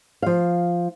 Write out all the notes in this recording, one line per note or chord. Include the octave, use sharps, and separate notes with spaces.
F3 F5